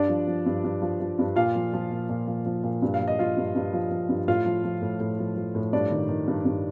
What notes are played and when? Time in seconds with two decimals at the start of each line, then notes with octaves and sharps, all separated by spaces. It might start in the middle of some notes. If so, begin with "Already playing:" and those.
Already playing: G2 D4 D5
0.08 F3
0.27 F3
0.46 G2
0.64 G2
0.82 F3
1.00 F3
1.19 G2
1.36 A#2 F4 F5
1.55 F3
1.73 F3
1.91 A#2
2.09 A#2
2.27 F3
2.46 F3
2.63 A#2
2.82 G2
2.94 F5
3.00 F3
3.08 D#5
3.18 F3 F4 F5
3.37 G2
3.55 G2
3.73 F3
3.91 F3
4.09 G2
4.28 A2 F4 F5
4.45 F3
4.64 F3
4.82 A2
5.00 A2
5.19 F3
5.36 F3
5.55 A2
5.73 G2 D4 D5
5.91 D#3
6.09 D#3
6.28 G2
6.45 G2